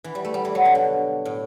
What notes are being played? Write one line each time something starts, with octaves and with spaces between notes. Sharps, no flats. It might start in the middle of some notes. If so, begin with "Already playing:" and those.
E3
G3
A3
G3
E3
F#3
D3
B2
A2